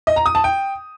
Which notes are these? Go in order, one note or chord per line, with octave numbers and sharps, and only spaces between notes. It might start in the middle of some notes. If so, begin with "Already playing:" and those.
D#5
A#5
D#6
A5
G5